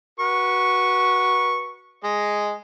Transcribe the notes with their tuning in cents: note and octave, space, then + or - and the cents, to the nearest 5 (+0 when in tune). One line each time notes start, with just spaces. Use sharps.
F#4 +0 B4 -30 C#6 +0
G#3 +0 D#5 +0